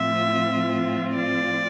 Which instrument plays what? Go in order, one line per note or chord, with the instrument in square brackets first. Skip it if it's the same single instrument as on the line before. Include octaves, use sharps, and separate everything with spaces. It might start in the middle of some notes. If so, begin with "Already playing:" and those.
Already playing: [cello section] A2 F3 C4 F4 [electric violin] E5
[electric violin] D5